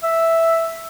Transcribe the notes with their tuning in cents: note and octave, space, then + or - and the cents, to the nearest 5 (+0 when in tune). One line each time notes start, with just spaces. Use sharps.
E5 +0